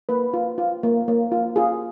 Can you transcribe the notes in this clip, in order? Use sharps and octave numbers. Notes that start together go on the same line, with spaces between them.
A#3 B4
F4
F4
A#3
A#3
F4
F4 G#4